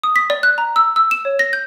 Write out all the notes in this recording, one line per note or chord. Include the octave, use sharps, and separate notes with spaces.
D#6
B6
D5
F#6
A#5
E6
E6
E7
C#5
A#6
G6